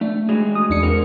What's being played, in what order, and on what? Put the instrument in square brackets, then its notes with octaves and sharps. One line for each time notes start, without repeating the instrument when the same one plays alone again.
[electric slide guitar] A3 [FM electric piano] D4
[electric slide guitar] G#3 F#4 G#4
[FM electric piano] D#6
E2 D4 C#7
[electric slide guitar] C4 A#4